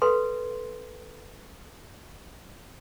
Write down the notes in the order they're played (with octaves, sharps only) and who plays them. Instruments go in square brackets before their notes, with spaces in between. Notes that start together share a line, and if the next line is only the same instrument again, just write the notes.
[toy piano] A4 B4 C6